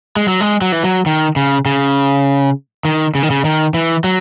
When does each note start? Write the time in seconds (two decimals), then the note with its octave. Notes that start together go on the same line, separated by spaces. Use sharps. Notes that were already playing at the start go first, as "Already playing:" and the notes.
0.16 G#3
0.28 F#3
0.41 G#3
0.61 F#3
0.72 E3
0.84 F#3
1.06 D#3
1.36 C#3
1.66 C#3
2.85 D#3
3.15 C#3
3.23 D#3
3.30 C#3
3.45 D#3
3.74 E3
4.04 F#3